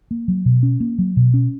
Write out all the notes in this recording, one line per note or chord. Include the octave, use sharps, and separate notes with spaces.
A#3
F#3
B2
C#4
A#3
F#3
B2
C#4